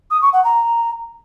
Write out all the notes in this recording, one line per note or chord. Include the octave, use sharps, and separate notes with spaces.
D#6
C#6
F#5
A#5